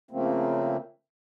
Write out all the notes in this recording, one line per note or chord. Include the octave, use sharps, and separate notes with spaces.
C#3 F3 A3 A#3 C4